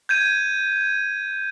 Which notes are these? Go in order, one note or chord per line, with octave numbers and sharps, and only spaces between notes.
G6 G#6 D#7